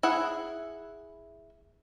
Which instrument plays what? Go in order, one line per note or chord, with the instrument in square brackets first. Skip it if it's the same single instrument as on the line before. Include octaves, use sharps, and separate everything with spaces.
[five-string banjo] E4 G#4 F#5